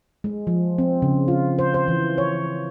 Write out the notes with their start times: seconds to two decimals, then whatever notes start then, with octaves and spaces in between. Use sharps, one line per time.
0.24 G#3
0.47 F3
0.78 C4
1.02 C#3
1.28 F4
1.59 C5
1.74 C5
1.88 E3
2.18 C#5